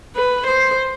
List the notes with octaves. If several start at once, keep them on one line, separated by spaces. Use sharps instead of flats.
B4
C5